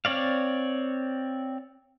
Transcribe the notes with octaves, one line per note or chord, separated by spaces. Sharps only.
C4 C#5 D5 F5